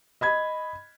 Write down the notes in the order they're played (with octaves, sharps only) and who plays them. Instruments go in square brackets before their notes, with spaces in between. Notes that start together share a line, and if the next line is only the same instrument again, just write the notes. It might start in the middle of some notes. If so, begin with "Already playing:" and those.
[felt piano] D#5 B5 G#6